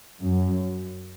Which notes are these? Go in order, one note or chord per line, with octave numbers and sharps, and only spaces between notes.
F#2